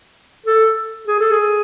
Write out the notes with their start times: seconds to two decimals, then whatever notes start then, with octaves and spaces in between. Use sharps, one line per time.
0.46 A4
1.07 G#4
1.20 A4
1.31 G#4